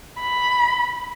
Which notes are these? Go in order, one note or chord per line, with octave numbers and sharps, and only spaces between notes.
B5